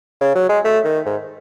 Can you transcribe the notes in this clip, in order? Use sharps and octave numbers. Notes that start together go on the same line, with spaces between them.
C#3
F#3
G#3
A3
D#3
G#2